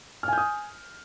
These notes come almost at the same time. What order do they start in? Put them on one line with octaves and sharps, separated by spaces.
F6 G#5 G6 D#6